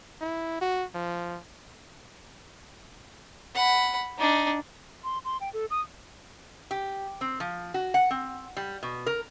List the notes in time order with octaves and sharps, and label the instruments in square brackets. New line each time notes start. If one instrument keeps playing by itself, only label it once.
[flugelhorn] E4
F#4
F3
[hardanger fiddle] F#5 B5
D4 D#4
[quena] C6
C6
G5
A4
D#6
[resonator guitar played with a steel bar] G4
C4
F3
F#4
F#5
C4
G3
B2
A#4